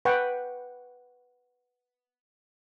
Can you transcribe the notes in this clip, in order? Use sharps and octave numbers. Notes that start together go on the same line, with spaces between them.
B4 F#5 G5 C#6